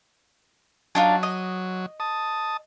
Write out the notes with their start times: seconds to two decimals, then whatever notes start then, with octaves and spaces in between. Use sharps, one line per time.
0.95 F#3 D4 D#4 F4
1.23 D#5
2.00 A5 D#6